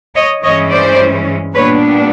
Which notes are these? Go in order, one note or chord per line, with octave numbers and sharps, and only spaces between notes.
C#5 D#5
G2 E3 G#3 C#4 C#5 D#5
C5 D5
A#2 G3 B3 D4 B4 C#5